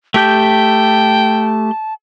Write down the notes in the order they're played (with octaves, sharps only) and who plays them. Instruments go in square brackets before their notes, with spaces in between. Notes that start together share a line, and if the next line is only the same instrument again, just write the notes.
[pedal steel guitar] A3 G4 G6 [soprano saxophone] G5 [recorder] A5